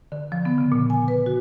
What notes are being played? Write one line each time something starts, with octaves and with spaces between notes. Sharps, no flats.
D3
F3
B3
C#3
A#2
G#5
B4
F#4